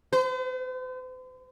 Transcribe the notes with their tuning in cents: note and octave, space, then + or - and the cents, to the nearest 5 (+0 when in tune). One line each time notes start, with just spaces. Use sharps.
C5 -45